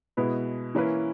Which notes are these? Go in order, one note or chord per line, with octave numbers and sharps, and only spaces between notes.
B2 G#3 B3 E4 B4
E3 A#3 C#4 E4 B4